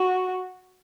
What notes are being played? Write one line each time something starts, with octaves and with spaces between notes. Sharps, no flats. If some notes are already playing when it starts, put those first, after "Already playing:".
Already playing: F#4